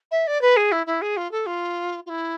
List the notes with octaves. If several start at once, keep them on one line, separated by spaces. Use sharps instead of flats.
E5
D5
B4
G#4
E4
E4
G#4
F4
A4
F4
F4
E4